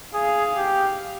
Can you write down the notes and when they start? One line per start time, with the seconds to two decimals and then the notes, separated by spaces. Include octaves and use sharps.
0.14 G#4 F5
0.57 G4